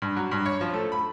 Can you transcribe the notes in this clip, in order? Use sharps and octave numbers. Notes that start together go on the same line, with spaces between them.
G2
F#3
G2
C#5
F3
A3
B5